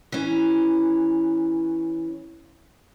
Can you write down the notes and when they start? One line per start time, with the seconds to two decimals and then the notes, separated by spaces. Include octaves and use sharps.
0.12 E3 C#4